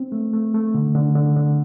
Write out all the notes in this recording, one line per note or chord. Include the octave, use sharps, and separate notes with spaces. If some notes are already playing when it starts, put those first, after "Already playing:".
Already playing: C4
A3
A3
A3
D3
D3
D3
D3